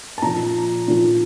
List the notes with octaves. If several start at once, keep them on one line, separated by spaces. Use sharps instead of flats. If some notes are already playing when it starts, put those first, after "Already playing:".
A5
A#2 F3 A#5
A#2 F3